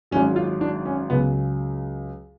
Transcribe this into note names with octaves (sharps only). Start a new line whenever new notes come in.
G#1 G#2 F#3 C#4
F4
D4
C#4
C#2 C#3 F#3 B3